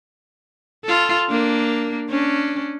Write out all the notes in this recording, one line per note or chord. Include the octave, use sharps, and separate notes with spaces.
F4 A4
A#3 D4
C#4 D4